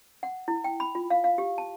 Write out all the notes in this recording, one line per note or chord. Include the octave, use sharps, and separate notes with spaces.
F#5
E4
G5
B5
F4
F5
F5
G4
A5